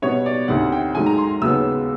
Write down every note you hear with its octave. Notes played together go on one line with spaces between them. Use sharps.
B2 G3 B3 C#5
D5
D2 C3 D#3 F#5
G5
G#2 D#3 F#3 A3 G#5
A#5
C6
D#2 C#3 F#3 B3 E6